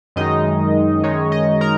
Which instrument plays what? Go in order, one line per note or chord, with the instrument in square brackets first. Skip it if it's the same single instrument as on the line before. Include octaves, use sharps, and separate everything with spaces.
[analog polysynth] F#2 D#3 G#3 D#4 D#5
F#2 D#3 G#3 D#4 C#5
D#5
A#4 A#5